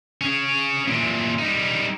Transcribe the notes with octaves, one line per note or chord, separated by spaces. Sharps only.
C#4 G#4
A#2 E3
G3 D#4